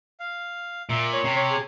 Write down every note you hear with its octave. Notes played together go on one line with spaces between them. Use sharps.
F5
A#2 E5
C#5
C3
C#5
G#4